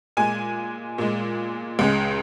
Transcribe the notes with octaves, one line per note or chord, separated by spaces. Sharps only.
A#2 G#3 G#5
A#2 G#3
C#2 C#3 G#3